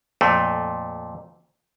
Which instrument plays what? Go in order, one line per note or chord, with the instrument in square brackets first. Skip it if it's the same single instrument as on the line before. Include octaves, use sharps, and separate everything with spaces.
[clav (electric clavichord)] F2 A#2 A3